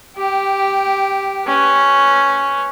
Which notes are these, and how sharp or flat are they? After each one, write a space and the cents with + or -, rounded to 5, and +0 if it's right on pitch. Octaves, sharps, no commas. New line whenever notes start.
G4 +0 G5 -15
C#4 +0 B4 +0